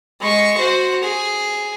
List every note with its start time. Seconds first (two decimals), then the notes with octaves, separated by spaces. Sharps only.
0.20 G#3 C#6
0.57 F#4 C5
1.03 G#4